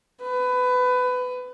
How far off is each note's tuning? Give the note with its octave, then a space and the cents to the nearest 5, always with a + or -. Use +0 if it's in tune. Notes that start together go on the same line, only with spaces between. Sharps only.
B4 +20